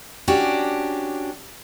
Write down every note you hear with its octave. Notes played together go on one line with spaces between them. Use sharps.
C#4 D4 F#4 G4